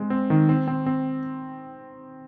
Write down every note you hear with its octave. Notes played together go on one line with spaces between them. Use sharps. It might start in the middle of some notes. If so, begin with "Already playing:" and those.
Already playing: G#3 C4
C4
D#3
C4
C4
C4